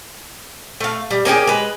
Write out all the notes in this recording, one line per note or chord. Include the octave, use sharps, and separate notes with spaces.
A3 F5
G3
A#3 C#4 G4 G#4
G#3 B4